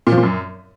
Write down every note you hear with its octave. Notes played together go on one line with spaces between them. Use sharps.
A#2
F3
A#2
F#2